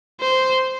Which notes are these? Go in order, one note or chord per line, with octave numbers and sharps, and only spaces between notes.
C5